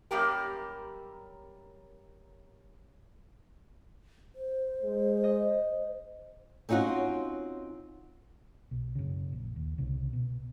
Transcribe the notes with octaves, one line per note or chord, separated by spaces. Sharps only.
F#2 G3 A#3 G4 A#4
C5
G#3
D#5
C4 C#4 D#4 F4 F#4
B1
F#2 C#3
A#1
D#2
C2 C#3
B2